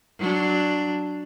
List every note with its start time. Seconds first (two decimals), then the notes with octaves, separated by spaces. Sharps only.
0.20 F#3 D4